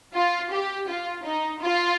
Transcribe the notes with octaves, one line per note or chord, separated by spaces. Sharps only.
F4
G4
F4
D#4
F4